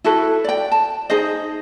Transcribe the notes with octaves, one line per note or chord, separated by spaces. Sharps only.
E4 F#4 A4 B4
D5 G5
A5
D#4 G#4 C5 D#5